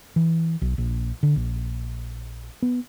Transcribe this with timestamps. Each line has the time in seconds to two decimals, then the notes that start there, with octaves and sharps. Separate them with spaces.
0.16 E3
0.62 B1
0.78 A#1
1.23 D3
1.36 A#1
2.62 B3